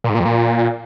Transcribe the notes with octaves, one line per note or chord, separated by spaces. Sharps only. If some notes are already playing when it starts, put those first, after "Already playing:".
A#2
G#2
A#2
F2
A#2